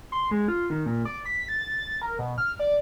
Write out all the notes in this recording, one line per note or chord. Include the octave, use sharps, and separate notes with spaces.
C6
G#3
F4
D#3
A#2
D5
B6
A6
A#4
B2
F6
D5